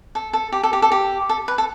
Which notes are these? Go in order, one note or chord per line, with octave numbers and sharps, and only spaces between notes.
A4
A4
G4
A4
G4
A4
G4
A4
B4
A4